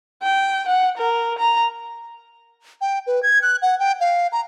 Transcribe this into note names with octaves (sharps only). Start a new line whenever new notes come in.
G5
F#5
A#4
A#5
G5
B4
G#6
F#6
F#5
G5
F5
A#5